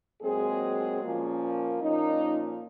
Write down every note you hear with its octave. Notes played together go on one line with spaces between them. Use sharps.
A#2 F#3 G#3 C4 G#4
A#2 F3 A#3 C#4
A#2 F3 A#3 C#4 D#4